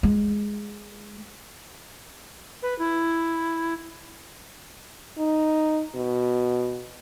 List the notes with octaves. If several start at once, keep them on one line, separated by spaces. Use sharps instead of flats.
G#3
B4
E4
D#4
B2